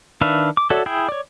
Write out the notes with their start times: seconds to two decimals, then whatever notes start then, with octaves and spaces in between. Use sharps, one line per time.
0.21 D#3 D4 B4 E5 F5
0.57 D6
0.70 F#4 A4 C#5 D5 E5
0.86 E4 G#4 G5
1.09 C#5 D5